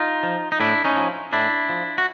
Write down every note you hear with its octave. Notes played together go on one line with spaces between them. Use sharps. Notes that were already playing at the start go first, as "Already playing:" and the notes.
Already playing: D#4 F4
F3
D#4
A2 D4 E4
C#4 D#4
F3
A2 D4 E4
F3
F#4